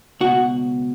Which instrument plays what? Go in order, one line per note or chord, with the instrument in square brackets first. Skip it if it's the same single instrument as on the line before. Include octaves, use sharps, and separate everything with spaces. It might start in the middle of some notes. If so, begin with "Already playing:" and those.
[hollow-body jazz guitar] C#2 B2 F#4